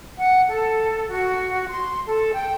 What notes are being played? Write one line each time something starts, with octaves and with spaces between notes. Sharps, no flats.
F#5
A4
F#4
C6
A4
G5